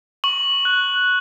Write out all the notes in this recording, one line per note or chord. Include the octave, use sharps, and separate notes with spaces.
C#6 F#7
F#6